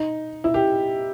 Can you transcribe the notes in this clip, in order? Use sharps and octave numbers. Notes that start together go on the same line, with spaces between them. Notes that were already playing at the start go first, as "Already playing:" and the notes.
Already playing: D#4
E4
G4